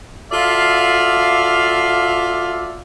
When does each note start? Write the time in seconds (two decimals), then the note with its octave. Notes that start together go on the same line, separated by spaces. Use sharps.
0.32 F4 F#4 A4 D5 E5 F5